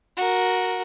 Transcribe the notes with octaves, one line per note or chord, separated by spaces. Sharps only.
F#4 A#4